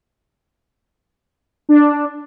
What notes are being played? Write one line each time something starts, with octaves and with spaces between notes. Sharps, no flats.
D4